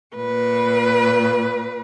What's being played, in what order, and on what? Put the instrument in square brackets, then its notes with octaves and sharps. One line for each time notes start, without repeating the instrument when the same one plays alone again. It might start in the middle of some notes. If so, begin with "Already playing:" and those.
[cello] A#2 B4